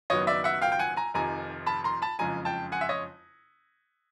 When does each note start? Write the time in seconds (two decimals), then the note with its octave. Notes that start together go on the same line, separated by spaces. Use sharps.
0.10 F#1 F#2 D#3 F#3 B3 C#5 D#5
0.27 D5 E5
0.44 E5 F#5
0.62 F5 G5
0.72 G5
0.79 F#5 G#5
0.97 G#5 A#5
1.14 F1 F2 C3 D#3 G#5 A#5
1.66 A5 B5
1.84 A#5 C6
2.02 A5 B5
2.19 F#1 F2 C#3 F3 G#3 G#5 A#5
2.45 G5 A5
2.72 F#5 G#5
2.81 E5
2.89 C#5 D#5